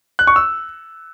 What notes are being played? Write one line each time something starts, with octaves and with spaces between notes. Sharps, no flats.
F#6
C#6
E6